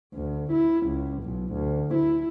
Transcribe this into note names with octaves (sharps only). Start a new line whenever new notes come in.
D2
E4
C#2
B1
D2
E4